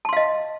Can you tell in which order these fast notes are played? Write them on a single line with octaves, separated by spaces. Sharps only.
A5 C6 F5 D#5